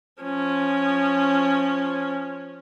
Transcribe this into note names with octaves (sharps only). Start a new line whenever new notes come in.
F3 C#4